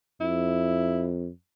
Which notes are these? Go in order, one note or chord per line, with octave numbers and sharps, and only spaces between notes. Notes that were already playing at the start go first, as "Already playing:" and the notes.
F2 E4